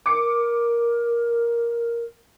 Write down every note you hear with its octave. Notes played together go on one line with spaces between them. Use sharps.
A#4 D6 C#7